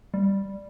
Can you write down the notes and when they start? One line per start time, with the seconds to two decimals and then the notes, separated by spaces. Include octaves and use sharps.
0.14 G3